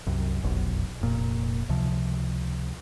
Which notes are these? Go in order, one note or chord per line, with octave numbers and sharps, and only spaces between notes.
C2 F#2
F1 B1 F#2
F1 A#2
C#2 C3 F3